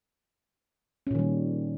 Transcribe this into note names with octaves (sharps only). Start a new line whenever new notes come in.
A#2 D#3 G3 C#4